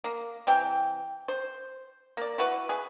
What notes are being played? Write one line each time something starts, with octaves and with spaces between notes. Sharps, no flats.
A#3
C3 E3 G5
C5
A#3 D5
E4 F#4 B4
G#4 B4